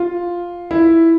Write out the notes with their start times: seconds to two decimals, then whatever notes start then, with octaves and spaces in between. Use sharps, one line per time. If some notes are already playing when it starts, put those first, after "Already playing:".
Already playing: F4
0.71 E4